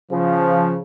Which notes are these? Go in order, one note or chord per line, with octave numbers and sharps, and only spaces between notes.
C#3 F3